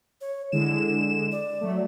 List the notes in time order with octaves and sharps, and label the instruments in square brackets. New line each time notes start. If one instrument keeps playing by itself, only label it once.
[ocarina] C#5
[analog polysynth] D3 G#3 E7 [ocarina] E4
[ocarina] D5
[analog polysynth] F#3 A3